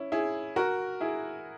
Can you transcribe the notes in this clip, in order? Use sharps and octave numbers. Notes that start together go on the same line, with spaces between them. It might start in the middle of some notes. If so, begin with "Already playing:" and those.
Already playing: C#4 E4
E4 G#4
F#4 A#4
E4 G#4